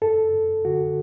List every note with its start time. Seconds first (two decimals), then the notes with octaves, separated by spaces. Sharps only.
0.02 F#2 A4
0.33 F#2
0.65 D3 F#4